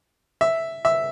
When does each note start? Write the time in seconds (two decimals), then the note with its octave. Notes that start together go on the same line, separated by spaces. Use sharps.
0.41 E5
0.85 E5